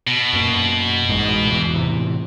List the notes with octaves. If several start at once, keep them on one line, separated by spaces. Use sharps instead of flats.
B2
F#2 A#2
A1 G#2 G#3
E2 E3
A2 C3 E3